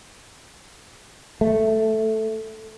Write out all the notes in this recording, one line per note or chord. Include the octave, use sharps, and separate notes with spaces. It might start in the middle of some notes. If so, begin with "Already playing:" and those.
A3